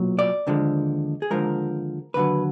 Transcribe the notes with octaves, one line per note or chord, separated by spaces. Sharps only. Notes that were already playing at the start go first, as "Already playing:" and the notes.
Already playing: B1 A#2 F#3
D5
D#2 D3 F3 G#3
G#4
D#2 D3 F3 G#3 A#4
D#2 D3 F#3 B4